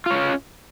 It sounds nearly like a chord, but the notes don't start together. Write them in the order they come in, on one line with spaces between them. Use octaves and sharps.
F4 C#5 C#4